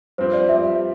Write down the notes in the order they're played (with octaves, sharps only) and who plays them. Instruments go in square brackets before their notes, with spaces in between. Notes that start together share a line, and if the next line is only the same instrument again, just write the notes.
[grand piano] G2 F3 C4 G4 [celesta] C5
[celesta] D5
[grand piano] G2 F3 C4 G4 [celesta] E5